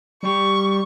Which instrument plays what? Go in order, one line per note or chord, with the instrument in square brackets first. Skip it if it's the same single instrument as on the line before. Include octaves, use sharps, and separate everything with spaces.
[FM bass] G3 [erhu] C#6